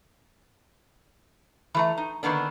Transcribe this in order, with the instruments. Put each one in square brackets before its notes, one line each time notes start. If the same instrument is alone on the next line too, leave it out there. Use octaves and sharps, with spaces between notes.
[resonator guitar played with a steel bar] E3 A3 A#5
D#4
D3 D#3 A#3 B3 D4